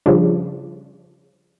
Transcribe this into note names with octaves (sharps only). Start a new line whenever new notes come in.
C#3 F3 G3 D4